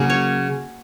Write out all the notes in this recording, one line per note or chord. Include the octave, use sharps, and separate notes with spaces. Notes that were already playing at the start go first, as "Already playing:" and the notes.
Already playing: C#3 F#3 A#3
C#5